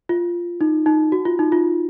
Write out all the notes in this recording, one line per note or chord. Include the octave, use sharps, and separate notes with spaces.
F4
D#4
D#4
F#4
F4
D#4
F4